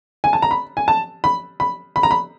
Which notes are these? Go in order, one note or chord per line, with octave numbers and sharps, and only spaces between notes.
G#5
A5
A#5
B5
G#5
A5
B5
B5
B5
A#5
B5